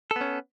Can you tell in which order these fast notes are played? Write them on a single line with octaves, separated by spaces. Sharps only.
A4 B3 C#4